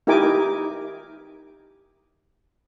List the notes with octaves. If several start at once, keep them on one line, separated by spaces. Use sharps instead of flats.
D#4 E4 G4 A#4 G#5 D6